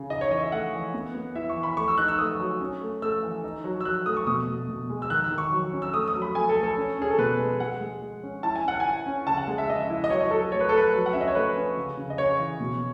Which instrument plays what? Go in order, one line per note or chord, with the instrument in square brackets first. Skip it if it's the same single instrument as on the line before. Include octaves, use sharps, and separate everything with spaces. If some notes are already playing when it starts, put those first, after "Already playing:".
Already playing: [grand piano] C#3
D#4 D#5
C#5
E3 D#5
E5
A3 F#5
E3
B3
B3
E4 E5
C#6
E3
B5
A3 C#6
E6
D#4 F#6
E6
A3 D#6
F#3
C#4
A3
A3 E6
E3
D#4
F#3
E6
F#3 F#6
A3 D#6
C#6
B2 D#6
B2
B2
G#3
E6
D#3 F#6
E6
D#3
C#6
F#3
C#4
E6
A3 D#6
D#6
F#3
B5
A3 G#5
A4
A3
A4
C#4
C#4 G#4
A4
B2 B4
G#3
G#3 F#5
G#3
G#3
C#4
E4 A5
G#5
C#4 F#5
G#5
E4
C#4
C#3 A5
F#5
G#3
E5
C#3 D#5
E5
E4
D#5
F#3 C#5
D#5
F#3 A4
A4
A3 C#5
B4
A4
A3 B4
F#3
F#5
C#4 E5
D#5
C#5
A3 B4
C#4
C#3
C#3
D#5
C#3 C#5
E3
B2